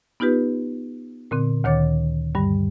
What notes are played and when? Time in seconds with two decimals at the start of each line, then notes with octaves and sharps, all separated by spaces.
0.20 B3 D#4 F4 G4 B4
1.31 A#2 D3 C4
1.64 D2 D#3 C#5 D6 A6
2.35 G2 D3 G3